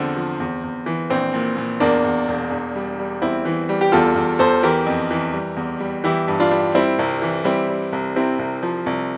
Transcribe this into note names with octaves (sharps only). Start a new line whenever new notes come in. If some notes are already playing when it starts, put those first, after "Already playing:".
Already playing: E2 D3 F3 C4
F3
E2
E2
E3
A#1 C4
A#2
A#2
E2 A#3 D4
E2
E1
E2
G3
G3
E2 C4 E4
E3
G3
G4
E2 F4 A4
E2
E2 A4 C5
E3 G4 A#4
F2
E3
G3
E2
G3
E3 E4 G4
G2
D4 F4
G3
G3 C4 E4
C2
E3
G3 C4 E4
G3
C2
C3 C4 E4
C2
F3
C2